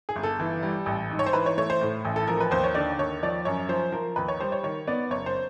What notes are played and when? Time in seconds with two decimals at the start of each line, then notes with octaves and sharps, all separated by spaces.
0.09 G#4
0.16 G1
0.23 A4
0.40 E3
0.63 G3
0.86 A1
1.11 G#2
1.19 C#5
1.26 C5
1.33 E3 B4
1.46 C#5
1.57 A3 C#5
1.70 C5
1.81 A2
2.05 A1
2.16 A4
2.27 F3 A#4
2.40 B4
2.51 D#2 C5
2.64 C#5
2.75 D3 D5
2.99 D#2 C#5
3.23 F3 D5
3.45 F#2 C#5
3.69 F3 C5
3.92 F3 A#4
4.16 D#2 B4
4.28 C#5
4.40 G3 C5
4.52 C#5
4.63 D#3 C#5
4.87 B3 D5
5.10 F#1 C#5
5.26 C5